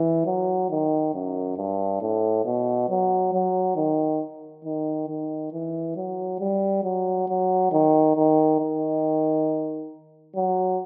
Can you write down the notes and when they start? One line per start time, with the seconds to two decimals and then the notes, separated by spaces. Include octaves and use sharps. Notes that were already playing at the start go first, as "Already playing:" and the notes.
Already playing: E3
0.26 F#3
0.70 D#3
1.14 F#2
1.57 G2
2.01 A2
2.45 B2
2.89 F#3
3.33 F#3
3.76 D#3
4.65 D#3
5.08 D#3
5.53 E3
5.96 F#3
6.40 G3
6.84 F#3
7.28 F#3
7.72 D#3
8.16 D#3
8.60 D#3
10.35 F#3